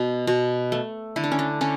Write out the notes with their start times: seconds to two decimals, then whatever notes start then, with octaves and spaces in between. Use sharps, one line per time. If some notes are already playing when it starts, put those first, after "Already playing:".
Already playing: B2
0.27 B2
0.72 A3
1.16 D3 E4
1.24 D4
1.32 C#4
1.39 D4
1.61 D3 C#4